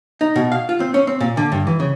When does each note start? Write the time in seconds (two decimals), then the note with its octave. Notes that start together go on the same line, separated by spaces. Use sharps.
0.21 D#4
0.36 B2
0.52 F5
0.69 F4
0.80 C4
0.94 C#4
1.07 C4
1.21 A#2
1.37 D3
1.52 G2
1.67 E3
1.80 C#3